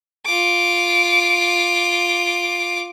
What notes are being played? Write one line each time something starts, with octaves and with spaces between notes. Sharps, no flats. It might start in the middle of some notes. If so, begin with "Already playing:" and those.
F4 D6